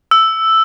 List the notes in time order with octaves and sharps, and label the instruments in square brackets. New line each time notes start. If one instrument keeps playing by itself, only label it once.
[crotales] E6